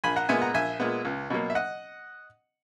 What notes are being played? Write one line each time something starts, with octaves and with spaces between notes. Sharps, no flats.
A#1 G#5 B5
F#5 A#5
A#2 G#3 B3 E5 G#5
F#5 A#5
A#1 E5 G#5
A#2 G#3 B3
C#2
B2 F#3 A#3
E5
D#5 F#5